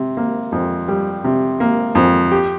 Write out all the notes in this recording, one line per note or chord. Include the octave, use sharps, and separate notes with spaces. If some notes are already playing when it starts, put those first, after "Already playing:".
Already playing: C3
A#3
F2
G3
C3
A#3
F2
G4